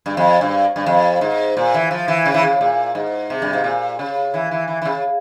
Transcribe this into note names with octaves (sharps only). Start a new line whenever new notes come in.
G2
F2
G2
G2
F2
G#2
A#2
E3
F3
E3
C#3
E3
C#3
A#2
G#2
C3
G2
G#2
A#2
C#3
E3
E3
E3
E3
C#3